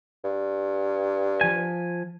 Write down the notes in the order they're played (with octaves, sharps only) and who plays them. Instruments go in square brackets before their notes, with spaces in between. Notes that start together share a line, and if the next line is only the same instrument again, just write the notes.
[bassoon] G2
[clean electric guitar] F3 G#5